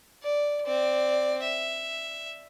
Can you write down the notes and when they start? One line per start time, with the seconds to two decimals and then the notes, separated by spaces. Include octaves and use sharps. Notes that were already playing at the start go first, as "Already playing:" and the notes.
0.23 D5
0.66 C4 D5
1.42 E5